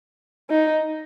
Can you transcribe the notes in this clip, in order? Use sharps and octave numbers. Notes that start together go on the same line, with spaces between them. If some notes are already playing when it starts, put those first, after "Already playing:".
D#4